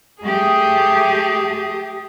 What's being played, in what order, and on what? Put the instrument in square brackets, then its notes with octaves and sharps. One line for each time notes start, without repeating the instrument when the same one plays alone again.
[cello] A3 G4 [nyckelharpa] G#4 D#6